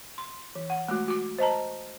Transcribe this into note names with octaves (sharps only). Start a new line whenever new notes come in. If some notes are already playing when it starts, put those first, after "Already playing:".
C6
E3
F#5
G#3 A3 F#4
F#4 D6
C5 D#5 A5 A#5